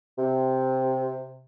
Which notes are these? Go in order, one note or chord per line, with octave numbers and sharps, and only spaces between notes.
C3